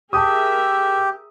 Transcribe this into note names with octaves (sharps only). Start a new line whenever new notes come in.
G4 G#4 A#4 E5 A5 D#6